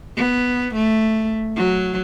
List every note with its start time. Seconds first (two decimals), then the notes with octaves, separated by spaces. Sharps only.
0.17 B3
0.75 A3
1.56 F#3